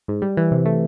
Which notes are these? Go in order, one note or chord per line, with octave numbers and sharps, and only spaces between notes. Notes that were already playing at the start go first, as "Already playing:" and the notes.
G#2
G3
E3
C3
A3